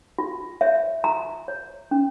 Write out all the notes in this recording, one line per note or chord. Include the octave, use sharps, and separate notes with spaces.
F4
C#5 E5
F4 A#5
C#5
C#4